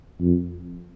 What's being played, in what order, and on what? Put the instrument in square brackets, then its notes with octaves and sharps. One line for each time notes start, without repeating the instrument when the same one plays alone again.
[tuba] F2